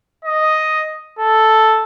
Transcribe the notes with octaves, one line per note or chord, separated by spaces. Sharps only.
D#5
A4